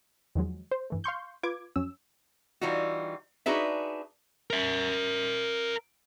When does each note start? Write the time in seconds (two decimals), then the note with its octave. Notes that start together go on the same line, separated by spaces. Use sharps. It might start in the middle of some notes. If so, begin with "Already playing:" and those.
0.35 E2 D#3 F3 F#3 G#3
0.71 C5
0.90 G2 E3 A3
1.04 F5 C6 C#6 G6
1.43 F4 B4 D6 G#6
1.76 F2 F#3 C#4 E6
2.61 E3 G3 D#4 F4 F#4
3.46 D4 D#4 F#4 G#4 B4 E5
4.50 A#4 E5